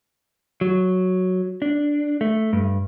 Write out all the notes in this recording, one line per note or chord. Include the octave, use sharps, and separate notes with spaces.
F#3
D4
A3
G2